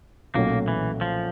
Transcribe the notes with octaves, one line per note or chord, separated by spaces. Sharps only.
B1 A#2 F#3 A3 A#3 C#4
E3
F3